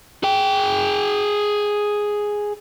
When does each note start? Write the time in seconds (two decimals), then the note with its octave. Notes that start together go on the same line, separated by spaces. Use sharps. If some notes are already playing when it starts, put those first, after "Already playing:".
0.23 G#4 G5